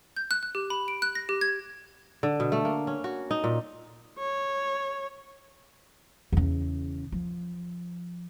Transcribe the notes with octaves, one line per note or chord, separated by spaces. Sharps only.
G6
F#6
F#6
G4
B5
D7
F#6
A#6
G4
G#6
D3
B2
A3
A#3
C#4
F#4
D#4
A#2
C#5
E2 C#3
F3